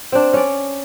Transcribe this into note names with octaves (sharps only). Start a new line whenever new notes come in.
C4 D4
C#4 D5